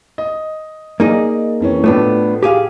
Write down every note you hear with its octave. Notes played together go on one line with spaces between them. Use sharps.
D#5
A#3 D#4 G#4 D5 D#5
F2 E3 C#4
A2 F3 A3 B3 D4
G4 G#4 F5